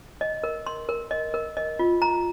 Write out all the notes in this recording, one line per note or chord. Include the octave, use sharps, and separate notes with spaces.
D#5
A#4
C6
A#4
D#5
A#4
D#5
F4
A#5